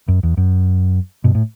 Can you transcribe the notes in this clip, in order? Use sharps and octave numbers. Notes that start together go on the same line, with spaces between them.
F#2
E2
F#2
G2 B2
A2